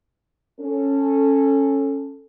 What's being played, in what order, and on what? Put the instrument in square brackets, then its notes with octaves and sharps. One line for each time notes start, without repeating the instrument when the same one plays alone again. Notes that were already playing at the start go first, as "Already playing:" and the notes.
[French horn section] C#4 A4